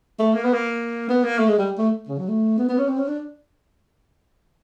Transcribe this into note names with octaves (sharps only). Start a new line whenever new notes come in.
A3
A#3
B3
A#3
B3
A#3
A3
G#3
G3
A3
C#3
F#3
A3
B3
B3
C#4
C4
C#4
D4